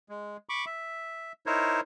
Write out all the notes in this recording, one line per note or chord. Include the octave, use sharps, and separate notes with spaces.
G#3
B5 C#6 D6
E5
D#4 E4 A#4 C5 C#5